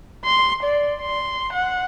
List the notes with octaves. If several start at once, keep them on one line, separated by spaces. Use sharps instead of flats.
C6
D5
C6
F#5